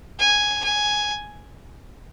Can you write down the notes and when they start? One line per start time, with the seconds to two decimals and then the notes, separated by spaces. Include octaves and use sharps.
0.19 G#5
0.64 G#5